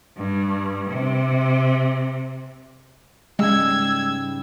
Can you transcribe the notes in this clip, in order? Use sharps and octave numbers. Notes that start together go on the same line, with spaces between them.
G2
C3
G#2 C#3 G3 G#3 E6 G#6